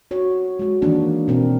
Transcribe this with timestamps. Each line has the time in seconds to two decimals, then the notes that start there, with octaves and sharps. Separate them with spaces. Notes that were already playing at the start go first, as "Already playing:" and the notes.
0.11 F#4 C#5
0.59 G#3 F#4
0.82 D#3 E3 A#3 D4
1.28 B2 C4 A#4